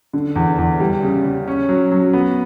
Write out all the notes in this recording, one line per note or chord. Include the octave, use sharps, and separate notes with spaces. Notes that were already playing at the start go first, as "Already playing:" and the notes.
D3
E2
E2
G3
C#3
C#3
C#4
F#3
F#3
B3